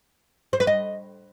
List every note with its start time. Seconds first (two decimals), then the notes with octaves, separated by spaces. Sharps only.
0.53 C5
0.60 B4
0.67 D#5